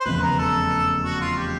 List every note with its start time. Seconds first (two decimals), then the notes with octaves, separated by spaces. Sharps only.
0.01 C5
0.05 F1 E2 C#3 B4
0.22 A#4
0.39 A4
1.04 F#4
1.21 F4
1.37 G4